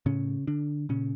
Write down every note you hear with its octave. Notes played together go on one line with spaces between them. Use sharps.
A2 C#3 C#4
D3 D4
A#2 C#3 C#4